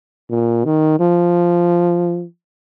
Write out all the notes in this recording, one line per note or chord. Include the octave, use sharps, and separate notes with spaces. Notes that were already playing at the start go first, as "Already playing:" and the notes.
A#2
D#3
F3